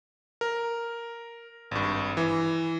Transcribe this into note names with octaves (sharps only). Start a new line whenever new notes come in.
A#4
G#1 G2
E3